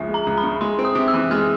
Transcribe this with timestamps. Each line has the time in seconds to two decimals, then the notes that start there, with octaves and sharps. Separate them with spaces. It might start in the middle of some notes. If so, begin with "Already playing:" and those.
Already playing: C#2 C#3 F3 E5
0.08 G#3
0.14 A#5
0.27 C#2
0.38 B5
0.43 C#3
0.61 G#3 C6
0.79 C4
0.85 D#6
0.95 C3
1.08 E6
1.14 E3
1.31 G#3 F6